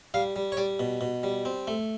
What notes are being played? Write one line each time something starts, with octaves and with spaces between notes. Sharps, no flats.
G3 F5
G3
C#5
G3 D5
B2
B2
G3
C4
A3